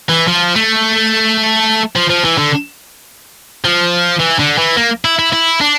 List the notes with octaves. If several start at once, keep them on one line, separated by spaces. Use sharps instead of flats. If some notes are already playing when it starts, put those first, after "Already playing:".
E3
F3
A3
F3
F3
E3
D3
F3
E3
D3
E3
A#3
E4
E4
E4
D4